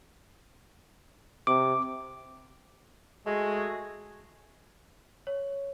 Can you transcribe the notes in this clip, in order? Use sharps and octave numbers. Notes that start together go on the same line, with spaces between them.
C3 D6
G#3 A3 F#4 G#4
C#5